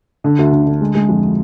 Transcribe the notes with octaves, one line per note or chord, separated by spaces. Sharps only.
D3
D2
D3
D3
G#3
G#3
F2